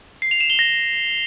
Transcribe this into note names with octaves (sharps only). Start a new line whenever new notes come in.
C7
F7
E7
G7
A#6